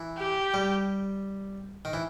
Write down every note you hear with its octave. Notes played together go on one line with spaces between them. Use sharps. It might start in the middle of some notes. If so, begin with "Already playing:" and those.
Already playing: E3
G4
G3
D#3
E3